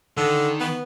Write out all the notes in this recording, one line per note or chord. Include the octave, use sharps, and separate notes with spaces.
D3 D#3
B3